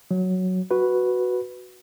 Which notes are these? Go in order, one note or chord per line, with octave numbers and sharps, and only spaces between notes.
F#3
F#4 B4